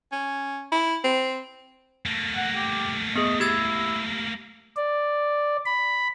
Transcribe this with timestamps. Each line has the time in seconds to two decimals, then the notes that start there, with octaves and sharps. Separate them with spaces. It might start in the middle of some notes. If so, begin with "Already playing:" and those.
0.12 C#4
0.72 E4
1.04 C4
2.06 A3 A#3
2.36 F#5
2.55 G4
3.16 B3 G#4 D#5
3.40 E4 G4 G#6 A6
4.77 D5
5.66 B5